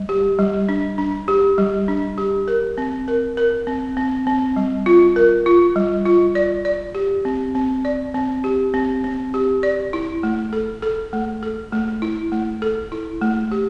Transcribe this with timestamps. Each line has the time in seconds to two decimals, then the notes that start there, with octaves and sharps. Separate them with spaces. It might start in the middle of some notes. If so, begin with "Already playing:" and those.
Already playing: G3
0.09 G4
0.39 G3
0.69 D4
0.98 D4
1.28 G4
1.58 G3
1.88 D4
2.18 G4
2.48 A#4
2.78 C4
3.08 A#4
3.37 A#4
3.67 C4
3.97 C4
4.27 C4
4.56 G3
4.86 F4
5.16 A#4
5.46 F4
5.76 G3
6.05 F4
6.35 D5
6.65 D5
6.95 G4
7.25 C4
7.55 C4
7.85 D5
8.15 C4
8.44 G4
8.74 C4
9.04 C4
9.34 G4
9.63 D5
9.93 E4
10.23 A3
10.53 A4
10.83 A4
11.13 A3
11.43 A4
11.72 A3
12.02 E4
12.32 A3
12.62 A4
12.92 E4
13.21 A3
13.51 G4